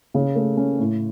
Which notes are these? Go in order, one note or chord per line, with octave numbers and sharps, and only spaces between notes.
C#3
A3
C#4
A2